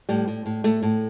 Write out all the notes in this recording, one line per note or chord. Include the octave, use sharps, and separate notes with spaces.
A2 G3
A2
A2
A2 A3
A2